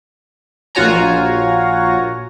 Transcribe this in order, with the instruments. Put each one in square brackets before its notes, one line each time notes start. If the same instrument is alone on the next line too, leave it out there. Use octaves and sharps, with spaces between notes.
[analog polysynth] A#1 F4 F#4 C#5 G#5 A#5